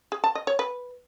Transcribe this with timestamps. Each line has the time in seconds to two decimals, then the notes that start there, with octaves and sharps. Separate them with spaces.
0.12 G#4
0.24 A5
0.35 D#5
0.47 C#5
0.59 B4